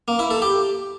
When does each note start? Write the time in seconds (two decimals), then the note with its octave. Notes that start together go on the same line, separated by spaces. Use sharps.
0.08 A#3
0.19 E4
0.31 A4
0.42 G4